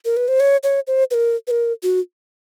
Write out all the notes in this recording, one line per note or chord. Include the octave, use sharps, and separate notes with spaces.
A#4
B4
C5
C#5
C#5
C5
B4
A#4
B4
A#4
F#4